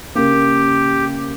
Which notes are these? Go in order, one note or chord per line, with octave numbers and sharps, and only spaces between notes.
C#3 A#3 G4